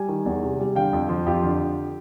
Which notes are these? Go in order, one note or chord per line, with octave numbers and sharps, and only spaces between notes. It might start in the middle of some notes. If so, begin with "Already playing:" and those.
Already playing: G3 G#5
D#3
E2
C3
G3
D3 F5 G5
F2
F3
F2 F4 G4
D3